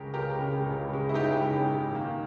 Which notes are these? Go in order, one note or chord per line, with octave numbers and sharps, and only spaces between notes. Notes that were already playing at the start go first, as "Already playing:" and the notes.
Already playing: C#2 C#3 G#3 G4 A#4
C#2 G4 A#4
C#3 G#3
C#2
C#3 G#3
E4
C#2 D#4 G4
C#3 G#3
G#2
D#3 A#3